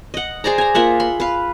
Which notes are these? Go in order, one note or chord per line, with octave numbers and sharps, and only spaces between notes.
D#5 F#5
G#4 C5 D5 A#5
G#5 A#5
A#3 F4 E5 F#5
B5 C6
B4 F5